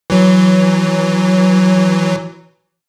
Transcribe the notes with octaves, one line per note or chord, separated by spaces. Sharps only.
E3 F#3